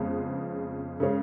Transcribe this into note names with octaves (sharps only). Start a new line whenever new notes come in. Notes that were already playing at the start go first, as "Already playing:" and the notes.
Already playing: F2 C#3 G#3 B3
C#3 G#3 C#4